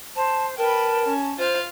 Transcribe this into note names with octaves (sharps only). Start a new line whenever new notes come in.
C5 A5
A#4 B4 G5 A5
C#4
F4 C5 F5